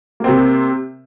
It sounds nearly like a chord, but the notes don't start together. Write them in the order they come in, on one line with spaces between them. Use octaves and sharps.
A#3 C4 C3